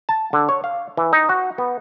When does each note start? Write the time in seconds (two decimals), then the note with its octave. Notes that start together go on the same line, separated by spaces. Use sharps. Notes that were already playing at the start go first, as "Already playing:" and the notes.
0.09 A5
0.33 D3
0.49 C#5
0.64 F5
0.97 E3
1.13 D#4
1.29 F#4
1.58 B3